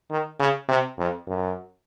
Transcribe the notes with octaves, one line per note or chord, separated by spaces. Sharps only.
D#3
C#3
C3
F2
F#2